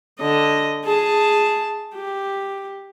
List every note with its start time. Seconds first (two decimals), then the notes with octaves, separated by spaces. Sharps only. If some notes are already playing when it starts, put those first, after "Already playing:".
0.20 D3 D#5
0.85 G#4 A5
1.95 G4